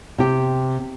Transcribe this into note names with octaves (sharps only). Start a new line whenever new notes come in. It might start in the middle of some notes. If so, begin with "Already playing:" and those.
C3 G4